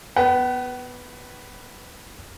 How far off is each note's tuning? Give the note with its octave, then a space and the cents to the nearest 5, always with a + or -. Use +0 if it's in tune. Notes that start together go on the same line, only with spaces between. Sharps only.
B3 +0 F#5 +45